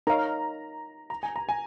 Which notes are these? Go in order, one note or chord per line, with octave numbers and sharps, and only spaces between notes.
D#4 A#4 C#5 F5 A#5
A#5
G#5
A#5
G#5